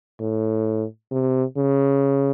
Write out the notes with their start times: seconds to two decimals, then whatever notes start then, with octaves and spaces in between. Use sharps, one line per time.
0.20 A2
1.11 C3
1.57 C#3